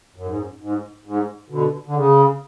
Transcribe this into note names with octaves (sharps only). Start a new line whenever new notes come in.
F#2
G#2
F#2
G#2
G#2
B2 D3
D3
C#3